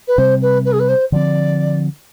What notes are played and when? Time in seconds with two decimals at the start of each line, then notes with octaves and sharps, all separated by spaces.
0.07 B4
0.18 C3 G3 C4 C5
0.42 B4
0.65 B4
0.72 G#4
0.79 B4
0.88 C5
1.12 D3 F3 C4 D5